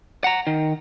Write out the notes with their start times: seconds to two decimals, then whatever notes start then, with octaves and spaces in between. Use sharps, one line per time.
0.24 F#5 A#5
0.47 D#3